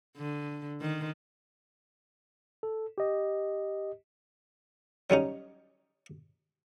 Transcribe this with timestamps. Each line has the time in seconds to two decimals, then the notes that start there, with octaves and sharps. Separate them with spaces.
0.17 D3
0.81 D#3
2.63 A4
2.98 G4 D#5
5.10 F#3 G3 C#4 D#4